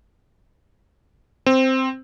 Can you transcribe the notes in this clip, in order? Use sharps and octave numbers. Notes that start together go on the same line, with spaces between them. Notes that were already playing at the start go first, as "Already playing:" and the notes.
C4